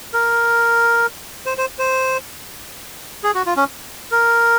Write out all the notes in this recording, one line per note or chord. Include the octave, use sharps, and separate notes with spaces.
A#4
C5
C5
C5
G#4
F#4
F4
C#4
A#4